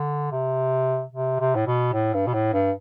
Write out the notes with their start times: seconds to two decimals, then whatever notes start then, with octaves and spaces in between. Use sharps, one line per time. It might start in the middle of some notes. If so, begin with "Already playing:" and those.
Already playing: D3
0.32 C3
1.13 C3
1.40 C3
1.55 A2
1.67 B2
1.93 A2
2.14 G2
2.27 B2
2.34 A2
2.53 G2